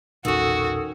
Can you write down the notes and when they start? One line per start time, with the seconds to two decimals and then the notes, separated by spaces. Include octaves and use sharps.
0.25 E1 A#1 D#3 C#4 F#4 A4 D#6 E6